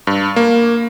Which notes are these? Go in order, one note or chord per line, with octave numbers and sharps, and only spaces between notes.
G2
A#3